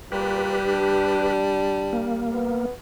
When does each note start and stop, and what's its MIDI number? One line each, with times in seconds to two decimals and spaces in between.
0.12 0.58 46
0.12 2.58 55
0.12 1.33 67
0.12 1.33 71
0.68 2.13 62
1.93 2.66 58
2.33 2.71 59